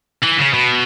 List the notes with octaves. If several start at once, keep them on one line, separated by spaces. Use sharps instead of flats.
E3
C#3
B2